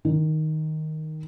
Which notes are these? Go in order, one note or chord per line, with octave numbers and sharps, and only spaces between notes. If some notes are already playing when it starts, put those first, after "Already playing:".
D#3